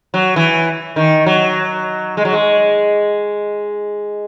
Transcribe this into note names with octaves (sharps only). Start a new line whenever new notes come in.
F#3
E3
D#3
F#3
G#3
F#3
G#3